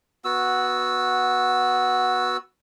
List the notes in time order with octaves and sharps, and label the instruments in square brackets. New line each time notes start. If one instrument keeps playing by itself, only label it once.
[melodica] B3 F#4 E6